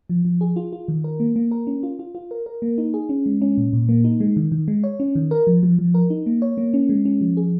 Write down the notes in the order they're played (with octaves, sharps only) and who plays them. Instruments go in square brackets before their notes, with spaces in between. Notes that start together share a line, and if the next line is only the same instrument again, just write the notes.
[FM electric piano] F3
F3
G#4
F4
F4
D#3
A#4
A#3
A#3
A#4
C#4
F4
F4
F4
A#4
A#4
A#3
D#4
G#4
C#4
G#3
C#4
A#2
A#2
A#3
D#4
G#3
D#3
D#3
G#3
C#5
C#4
D#3
A#4
F3
F3
F3
A#4
D#4
A#3
C#5
A#3
C#4
G#3
C#4
F3
G#4